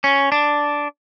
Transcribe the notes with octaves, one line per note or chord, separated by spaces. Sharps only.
C#4
D4